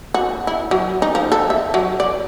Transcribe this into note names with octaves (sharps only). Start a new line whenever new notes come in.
F#4
E4
F#3
D#4
F3
A4
E5
F#3
D5